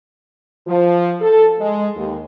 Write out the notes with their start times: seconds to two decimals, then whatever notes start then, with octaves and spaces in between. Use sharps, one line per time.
0.67 F3
1.20 A4
1.59 G#3
1.96 D#2